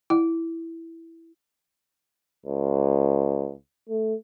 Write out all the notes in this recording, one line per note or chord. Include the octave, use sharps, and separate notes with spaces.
E4
C#2
A3